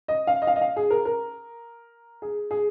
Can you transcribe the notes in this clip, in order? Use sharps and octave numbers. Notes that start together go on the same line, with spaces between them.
D#5
F5
D#5
F5
D#5
F5
G#4
A#4
A#4
G#4
G#4